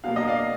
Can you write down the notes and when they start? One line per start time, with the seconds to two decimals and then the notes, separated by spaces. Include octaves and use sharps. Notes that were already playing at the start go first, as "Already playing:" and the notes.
0.04 B2 F#3 A#3 F5
0.16 D#5
0.28 D5 F5